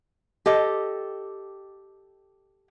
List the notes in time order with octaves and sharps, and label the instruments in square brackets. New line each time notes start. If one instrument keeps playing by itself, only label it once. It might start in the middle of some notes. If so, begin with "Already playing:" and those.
[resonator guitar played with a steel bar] G4 A4 D#5